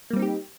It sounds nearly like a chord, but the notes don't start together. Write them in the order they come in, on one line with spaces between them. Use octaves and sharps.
A#3 G3 C4 D#4 G4